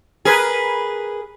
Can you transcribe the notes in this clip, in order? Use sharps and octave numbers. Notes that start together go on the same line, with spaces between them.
G#4 A#4 B4